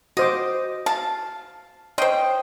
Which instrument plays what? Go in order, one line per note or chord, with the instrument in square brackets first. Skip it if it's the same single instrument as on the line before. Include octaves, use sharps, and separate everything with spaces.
[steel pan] F#4 C5 D6 [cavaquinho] D#5
[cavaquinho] F5 [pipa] A5
[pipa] C5 D#5 [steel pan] C#5 C6 [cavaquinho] G5